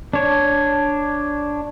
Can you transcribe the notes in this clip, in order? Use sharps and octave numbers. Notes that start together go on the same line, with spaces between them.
D4 C#5